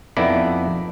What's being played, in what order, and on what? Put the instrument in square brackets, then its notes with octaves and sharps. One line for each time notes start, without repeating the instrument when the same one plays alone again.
[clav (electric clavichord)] F2 B3 D#4 E4 A4 D5